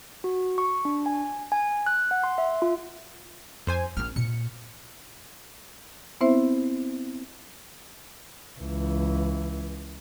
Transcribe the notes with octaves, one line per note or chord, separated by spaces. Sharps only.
F#4
C#6
D4
G#5
G#5
F#6
F#5
C6
E5
F4
F2 C5 G#5
A#1 C4 F6
A#2 C#7
B3 C4 E4 C5 E5
C#2 E3